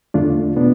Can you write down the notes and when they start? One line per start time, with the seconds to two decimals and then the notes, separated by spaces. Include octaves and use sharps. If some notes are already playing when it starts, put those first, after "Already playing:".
0.14 E2 D3 A3 D4 F4
0.56 B2 B3 D4 F4